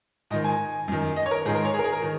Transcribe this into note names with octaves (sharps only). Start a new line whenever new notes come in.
G#2 D#3 D#5
G#5
F#2 D#3
D#5
C#5
A#4
G#2 D#3 G#4
A#4
C#5
G#4
A#4
G#4
A#4
D#3